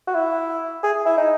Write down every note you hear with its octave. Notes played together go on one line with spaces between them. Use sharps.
F#4
E4
G#4
E4
D#4